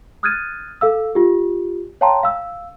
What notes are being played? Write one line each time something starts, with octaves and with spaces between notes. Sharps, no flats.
D#6 F6 F#6 G#6 A6 D#7
A4 F5 E6
F4 G4
C#5 F5 G5 A5 A#5 C6
F5 E6